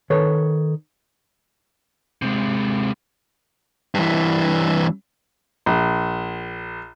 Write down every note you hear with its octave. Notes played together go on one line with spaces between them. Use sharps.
D#3 A4 B4 C#5
C3 G#3
G2 E3
A#1